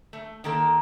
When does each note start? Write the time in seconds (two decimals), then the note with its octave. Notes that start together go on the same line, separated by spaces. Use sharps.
0.13 A3
0.44 D#3 A#3 A4